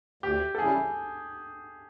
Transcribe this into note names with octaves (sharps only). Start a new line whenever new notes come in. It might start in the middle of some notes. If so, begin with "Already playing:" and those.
D2 G4
A4
C#3 E3 G3 G#4